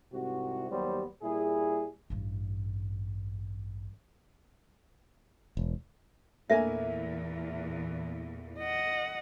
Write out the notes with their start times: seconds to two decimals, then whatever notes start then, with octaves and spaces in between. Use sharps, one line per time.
0.12 C2 G#2 C3 F#4
0.69 D#2 F#3 G3 B3 F#4 C5
1.22 A#2 G3 E4 G#4
2.10 A1 G2
5.57 E1
6.50 E2 A#2 E3 A3 A#3 E5 G#5
8.59 D#5 F#5